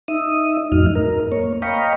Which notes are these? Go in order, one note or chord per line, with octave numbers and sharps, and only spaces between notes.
D#4 E5 D#6
F2 A2 F#3 D#4 F6
A#4
A#3 C#5
D#5 F5 G5 A#5 B5 C#6